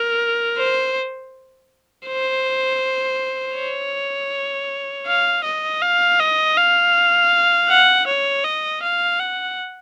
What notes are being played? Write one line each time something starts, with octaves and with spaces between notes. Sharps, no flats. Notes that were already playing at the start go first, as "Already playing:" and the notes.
Already playing: A#4
C5
C5
C#5
F5
D#5
F5
D#5
F5
F#5
C#5
D#5
F5
F#5